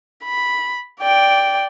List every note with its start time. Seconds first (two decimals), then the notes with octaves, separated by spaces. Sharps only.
0.24 B5
1.01 D5 G5